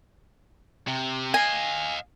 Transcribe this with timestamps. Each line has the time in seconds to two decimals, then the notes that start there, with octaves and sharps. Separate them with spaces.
0.87 C3
1.34 D#5 F5 G#5